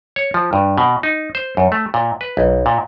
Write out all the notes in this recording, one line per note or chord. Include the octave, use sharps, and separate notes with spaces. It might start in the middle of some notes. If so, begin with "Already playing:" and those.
C#5
F3
G2
B2
D#4
C5
F#2
A3
A#2
B4
B1
A#2